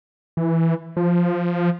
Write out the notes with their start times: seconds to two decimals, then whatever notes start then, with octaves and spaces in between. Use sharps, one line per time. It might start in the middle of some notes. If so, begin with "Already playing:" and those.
0.37 E3
0.97 F3